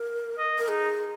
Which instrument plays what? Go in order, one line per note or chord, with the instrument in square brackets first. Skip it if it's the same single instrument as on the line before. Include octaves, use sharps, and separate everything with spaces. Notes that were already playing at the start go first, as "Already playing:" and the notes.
Already playing: [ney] A#4
[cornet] D#5
[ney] A#4
[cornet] D#4 [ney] G#4